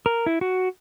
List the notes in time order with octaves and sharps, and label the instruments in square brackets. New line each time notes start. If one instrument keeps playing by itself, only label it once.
[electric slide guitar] A#4
E4
F#4